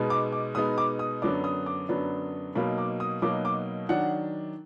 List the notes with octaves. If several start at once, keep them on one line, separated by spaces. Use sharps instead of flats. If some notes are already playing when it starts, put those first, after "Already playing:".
Already playing: B2 G#3 B3 D#4
D6
D6
B2 G#3 B3 D#4 D#6
D6
D#6
F#2 D3 F#3 B3 D4 D6
D#6
D6
F#2 D3 F#3 B3 D4
B2 F#3 A#3 D#4 B5
D6
D#6
B2 F#3 A#3 D#4 D6
D6
D#3 F#3 D4 F#5